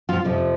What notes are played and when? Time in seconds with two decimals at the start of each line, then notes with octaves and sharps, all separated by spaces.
0.09 F3 F4
0.24 F2 C3 F3